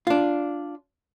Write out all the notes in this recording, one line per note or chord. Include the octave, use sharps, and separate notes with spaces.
D4 F4